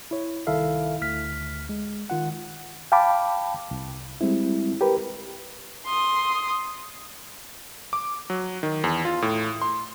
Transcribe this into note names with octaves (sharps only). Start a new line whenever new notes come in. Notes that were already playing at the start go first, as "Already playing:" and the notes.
E4 C#5
C2 D#3 E4 A4 E5 F5
D2 F6 B6
G#3
D#3 F4 F#5
F5 G5 A5 B5 D6
C2
G3 G#3 C4 E4
G4 A#4 B4
C6 D#6
D6
F#3
D#3
E2
F4
A2
C6